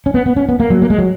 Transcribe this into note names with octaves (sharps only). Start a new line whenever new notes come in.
C#4
B3
B3
C#4
B3
A#3
F#3
A#3
G#3
F#3